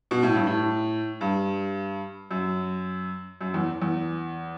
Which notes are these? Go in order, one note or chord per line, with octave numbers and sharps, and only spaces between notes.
B2
A2
G2
A2
G2
F#2
F#2
E2
E2